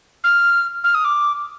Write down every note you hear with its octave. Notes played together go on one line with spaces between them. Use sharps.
F6
F6
D#6
D6